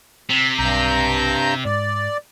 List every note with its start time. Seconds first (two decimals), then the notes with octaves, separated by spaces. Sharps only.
0.29 C3
0.59 B1 G2 A#5 G6
1.65 G#2 D5